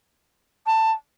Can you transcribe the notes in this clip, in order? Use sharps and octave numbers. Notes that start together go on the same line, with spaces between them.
A5